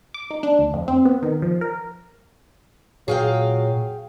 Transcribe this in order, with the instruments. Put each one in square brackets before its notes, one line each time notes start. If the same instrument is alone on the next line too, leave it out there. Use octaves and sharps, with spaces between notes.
[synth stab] D6
D#4
D4
D2
F2
C4
B3
D#3
F3
A#4
[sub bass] A#2 [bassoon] F#3 [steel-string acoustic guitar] G#4 F5 G5